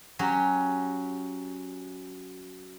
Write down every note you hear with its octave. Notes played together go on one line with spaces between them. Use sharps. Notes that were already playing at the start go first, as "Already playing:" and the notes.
F#3 C#4 G4